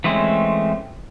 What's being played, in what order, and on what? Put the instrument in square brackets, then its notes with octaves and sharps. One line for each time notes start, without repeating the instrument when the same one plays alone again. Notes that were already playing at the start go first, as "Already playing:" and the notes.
[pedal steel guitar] E3 G#3 A3 C4 C#4